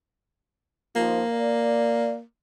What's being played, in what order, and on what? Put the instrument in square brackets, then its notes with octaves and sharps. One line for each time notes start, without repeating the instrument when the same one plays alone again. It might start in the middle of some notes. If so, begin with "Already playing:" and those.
[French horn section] D#2 F3 [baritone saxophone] A#3
[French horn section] D5